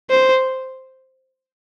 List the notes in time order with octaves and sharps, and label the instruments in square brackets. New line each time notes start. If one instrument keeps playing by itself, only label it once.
[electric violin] C5